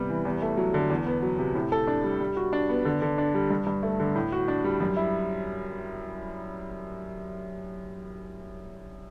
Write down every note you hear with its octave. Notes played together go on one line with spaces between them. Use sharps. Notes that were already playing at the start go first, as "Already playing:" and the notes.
Already playing: C3 G3 B3
E3
E2
A3
F#3
D3
E2
B3
F#3
C3
A2
A4
D4
G3
G3
F#4
D4
B3
D3
D3
D4
G3
G2
G2
A3
D3
A2
F#4
D4
G3
F#2
E4